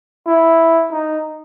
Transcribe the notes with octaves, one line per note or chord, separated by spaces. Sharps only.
E4
D#4